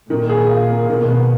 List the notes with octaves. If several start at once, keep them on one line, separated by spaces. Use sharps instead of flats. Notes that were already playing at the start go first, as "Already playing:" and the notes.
A#2 D#3
G#4
F4
A#3
B2 D#3
B3